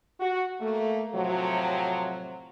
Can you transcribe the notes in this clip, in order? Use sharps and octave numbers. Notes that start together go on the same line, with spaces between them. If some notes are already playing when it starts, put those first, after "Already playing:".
F#4
A3 A#3
A2 C3 F3 F#3